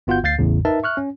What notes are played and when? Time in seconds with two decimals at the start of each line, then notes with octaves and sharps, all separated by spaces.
0.07 G1 B3 F4 F#4 F#5 G6
0.23 D2 F5 G6 A6 C7
0.39 A1 E2 A2 C#3
0.65 D#4 A#4 B4 E5 A5
0.83 E5 C#6 F6 F#6
0.97 C#4